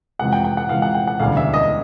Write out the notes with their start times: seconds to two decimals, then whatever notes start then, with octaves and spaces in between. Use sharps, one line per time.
0.19 F2 C3 E3 G#3 F#5
0.32 G5
0.44 G5
0.57 F#5
0.69 F2 C3 E3 G#3 F5
0.82 F#5
0.94 G5
1.07 F#5
1.20 E1 D2 C#3 E3 G3 F5
1.37 E5
1.54 D#5